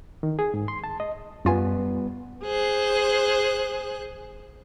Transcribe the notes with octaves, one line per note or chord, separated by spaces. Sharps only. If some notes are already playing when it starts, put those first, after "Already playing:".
D#3
G#4
G#2
C6
A5
D#5
F#2 G3 B3 F4 G#5
G#4 C5 F#6